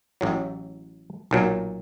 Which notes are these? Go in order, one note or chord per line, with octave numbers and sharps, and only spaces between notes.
A1 A2 F#3
B1 A#2 F#3